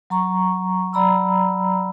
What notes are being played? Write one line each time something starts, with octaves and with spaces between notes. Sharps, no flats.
F#3 A#5 C#6
F#3 D5 A#5 B5 E6